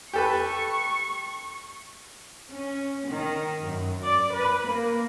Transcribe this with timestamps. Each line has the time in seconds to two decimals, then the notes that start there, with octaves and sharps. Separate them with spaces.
0.13 G4 A4 B4 C#6
2.50 C#4
3.08 D#3
3.62 F#2
4.03 D5
4.34 B4
4.68 A#3